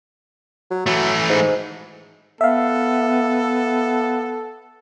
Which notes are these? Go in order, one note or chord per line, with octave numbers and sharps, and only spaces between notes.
F#3
E3 F#3 A3
G#2
B3 A4 E5 F5